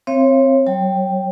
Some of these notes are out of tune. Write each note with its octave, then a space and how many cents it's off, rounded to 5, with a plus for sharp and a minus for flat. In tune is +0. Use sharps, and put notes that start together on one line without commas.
C4 +0 C#5 -30 F5 -40
F#3 +35 C#5 -25 G5 +0